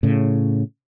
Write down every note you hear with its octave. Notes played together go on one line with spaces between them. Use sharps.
A2 C#3